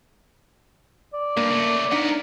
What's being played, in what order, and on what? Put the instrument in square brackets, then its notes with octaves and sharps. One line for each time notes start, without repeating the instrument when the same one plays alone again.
[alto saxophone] D5
[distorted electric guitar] G2 [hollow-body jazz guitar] A#3
[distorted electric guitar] C#3 A3
[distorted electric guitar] B3 A#4 [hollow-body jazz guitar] D4 D#4